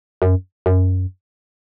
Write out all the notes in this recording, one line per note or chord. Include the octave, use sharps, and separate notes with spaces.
F#2
F#2